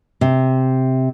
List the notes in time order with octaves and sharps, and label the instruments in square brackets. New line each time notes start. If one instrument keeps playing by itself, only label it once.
[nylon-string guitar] C3